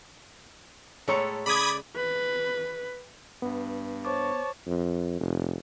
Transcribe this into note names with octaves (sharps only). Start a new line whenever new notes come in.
A2 G#3 E4 A4 C#5 A#5
C#3 D5 B5 D#6 G#6
B4
G2 B3
C5 C#5 A5 C#6 D6
F2
F1